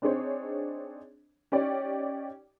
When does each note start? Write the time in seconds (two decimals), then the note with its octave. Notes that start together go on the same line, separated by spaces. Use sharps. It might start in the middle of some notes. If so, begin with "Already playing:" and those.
0.02 C4 D4 D#4 G#4 C5 C#5
1.52 C#4 D#4 G4 C#5 D5